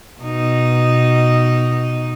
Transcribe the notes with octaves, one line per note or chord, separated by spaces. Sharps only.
B2 D#4